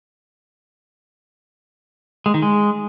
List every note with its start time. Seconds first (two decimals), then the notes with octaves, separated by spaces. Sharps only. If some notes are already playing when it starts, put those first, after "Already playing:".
2.26 G#3
2.34 D#3
2.42 G#3